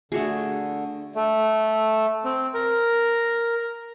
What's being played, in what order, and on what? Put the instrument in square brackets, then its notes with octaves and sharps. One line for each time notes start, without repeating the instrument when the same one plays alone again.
[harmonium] D3 [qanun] A3 F#4 G#4
[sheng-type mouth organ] A3
C4
A#4